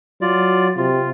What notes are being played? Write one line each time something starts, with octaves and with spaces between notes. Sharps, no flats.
F#3 F4 D5
C3 F4